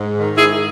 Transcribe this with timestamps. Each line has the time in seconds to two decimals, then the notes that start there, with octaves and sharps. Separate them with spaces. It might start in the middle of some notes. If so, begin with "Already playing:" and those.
Already playing: G#2
0.16 D#3
0.37 G#2 E4 G#4